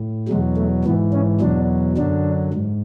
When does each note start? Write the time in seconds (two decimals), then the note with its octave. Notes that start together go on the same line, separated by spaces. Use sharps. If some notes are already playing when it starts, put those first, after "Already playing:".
Already playing: A2
0.28 E2 B2 F#3 G#3
0.57 A3
0.85 G#2 E3 B3
1.13 C#4
1.41 E2 B2 F#3 D4
1.97 F#2 D3 F#3 D4
2.54 G#2